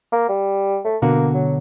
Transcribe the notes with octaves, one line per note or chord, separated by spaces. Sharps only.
A#3
G3
A3
B2 D3 A#3 F#4
F#3